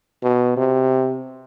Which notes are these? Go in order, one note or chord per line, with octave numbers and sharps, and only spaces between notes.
B2
C3